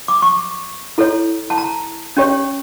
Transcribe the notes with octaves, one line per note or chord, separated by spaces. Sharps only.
D6
C#6
E4 A4 C#5
A5
A#5
C#4 G4 C#5